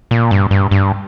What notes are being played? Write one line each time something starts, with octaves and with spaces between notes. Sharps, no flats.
A#2
G2
G2
G2